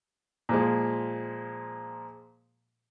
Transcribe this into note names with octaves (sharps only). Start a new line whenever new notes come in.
A#2 F3 G#3